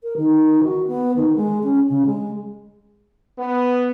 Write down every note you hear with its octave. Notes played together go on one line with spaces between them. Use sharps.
A#4
D#3
F#4
B3
D#3
G#3
C#4
C#3
G#3
B3